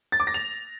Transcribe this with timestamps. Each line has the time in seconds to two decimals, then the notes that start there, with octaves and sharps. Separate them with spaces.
0.12 A6
0.20 D6
0.27 A#6
0.34 F7